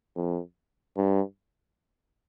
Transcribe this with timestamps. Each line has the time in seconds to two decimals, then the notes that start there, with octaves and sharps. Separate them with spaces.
0.16 F2
0.97 G2